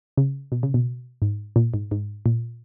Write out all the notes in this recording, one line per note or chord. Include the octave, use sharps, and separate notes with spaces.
C#3
B2
C#3
B2
G#2
A#2
G#2
G#2
A#2